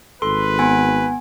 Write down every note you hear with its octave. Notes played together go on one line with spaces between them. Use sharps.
G#1 A4 B4 C6
B3 G#5